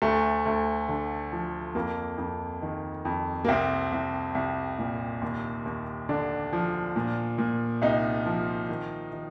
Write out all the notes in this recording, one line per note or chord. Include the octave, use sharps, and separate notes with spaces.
D2 A3
D2
D3
F3
F2 A#3
F2
D#3
F2
A#3
C2 C4
C2
C2
A#2
D#2
D#2
D3 D4
F3
A#2
A#2
C2 D#4
F3
D#3
D#3